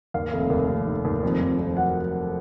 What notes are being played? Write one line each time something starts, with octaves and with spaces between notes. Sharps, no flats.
D#2 F5
F1
D#2
F1
D#3
D#2
F2
F2
F2
F#3 F#5